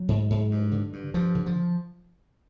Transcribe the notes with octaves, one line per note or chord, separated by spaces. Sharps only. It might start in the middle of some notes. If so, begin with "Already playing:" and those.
Already playing: F#3
G#2
G#2
G2
D3
G2
G2 F3
D3
F3